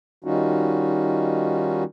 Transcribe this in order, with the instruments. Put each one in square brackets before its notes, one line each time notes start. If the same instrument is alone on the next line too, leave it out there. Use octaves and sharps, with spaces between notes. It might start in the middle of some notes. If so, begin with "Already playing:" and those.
[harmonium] D#3 G3 C#4 D#4 F4 F#4